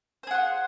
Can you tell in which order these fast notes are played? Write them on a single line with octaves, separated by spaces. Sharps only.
C5 G#4 F#5 F4